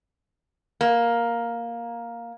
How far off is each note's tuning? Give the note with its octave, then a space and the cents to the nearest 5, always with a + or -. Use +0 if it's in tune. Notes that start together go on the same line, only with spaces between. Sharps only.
A#3 +5